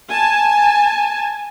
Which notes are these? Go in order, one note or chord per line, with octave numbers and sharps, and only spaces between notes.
G#5 A5